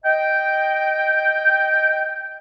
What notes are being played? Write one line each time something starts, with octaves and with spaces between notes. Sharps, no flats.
D#5 G5